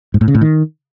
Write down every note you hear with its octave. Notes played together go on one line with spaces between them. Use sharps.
G#2
A2
C#3
A2
D#3